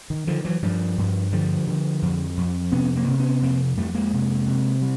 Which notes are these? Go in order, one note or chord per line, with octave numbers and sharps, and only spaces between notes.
D#3
D3 D#3 F3
E3 F#3
G2 F3 G3
G2
D3 F3 G3
D3
F2
F2
C3 B3 C#4
A#3 C4
C3
B3 C#4
F2 A#3 C4
F2 G3 A3
G#3 A#3
C3
C3
G3